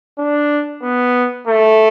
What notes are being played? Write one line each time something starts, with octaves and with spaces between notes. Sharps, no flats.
D4
B3
A3